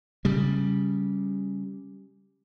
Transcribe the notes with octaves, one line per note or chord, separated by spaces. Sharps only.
C#3 G3